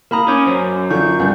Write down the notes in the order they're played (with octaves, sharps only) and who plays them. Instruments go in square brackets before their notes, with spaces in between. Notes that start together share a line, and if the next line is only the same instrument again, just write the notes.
[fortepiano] A#3 A#5 [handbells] A#4 B5 D#6
[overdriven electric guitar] C#4 [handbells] D6 G6
[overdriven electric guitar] F#2 [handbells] C5
[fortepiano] D3 F3 [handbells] C#6 [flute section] G6
[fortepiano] C#2 G2